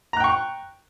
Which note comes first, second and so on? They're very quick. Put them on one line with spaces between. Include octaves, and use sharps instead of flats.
A#5 F#6 G5 C#6